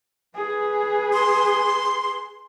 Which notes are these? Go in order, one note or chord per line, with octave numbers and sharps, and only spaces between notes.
G#4 B4
C6